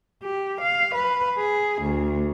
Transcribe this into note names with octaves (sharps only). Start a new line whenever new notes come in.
G4
F5
B4
G#4
D2